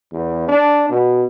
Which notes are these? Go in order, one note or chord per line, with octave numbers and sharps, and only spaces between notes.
E2
D4
B2